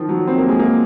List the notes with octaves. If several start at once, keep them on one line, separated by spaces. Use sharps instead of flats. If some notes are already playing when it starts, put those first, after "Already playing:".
Already playing: D#3 F3
F#3
C4
A#3
G#3
A#3